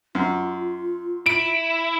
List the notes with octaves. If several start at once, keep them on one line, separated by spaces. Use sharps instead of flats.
F#2 F4
E4 D7